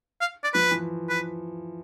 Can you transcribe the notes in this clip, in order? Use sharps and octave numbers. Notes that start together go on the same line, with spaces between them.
F5
D5
F3 B4
E3
B4